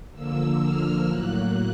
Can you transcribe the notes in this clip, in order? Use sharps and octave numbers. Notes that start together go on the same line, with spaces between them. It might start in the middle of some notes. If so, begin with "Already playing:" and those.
D3 F3 A#3 E6
F6
A2 F#3 A#3 F#6